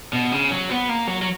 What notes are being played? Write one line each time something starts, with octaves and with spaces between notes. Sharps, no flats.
B2
C#3
F#3
B3
A#3
F#3
F#3